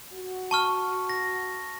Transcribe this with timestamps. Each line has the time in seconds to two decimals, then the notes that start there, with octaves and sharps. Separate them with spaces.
0.13 F#4
0.51 A5 C#6 F6
1.09 A#6